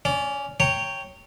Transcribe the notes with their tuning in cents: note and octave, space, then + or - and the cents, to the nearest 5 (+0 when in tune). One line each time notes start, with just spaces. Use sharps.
C#4 +5 D5 -25
C#5 +0 G5 +0 A#5 -20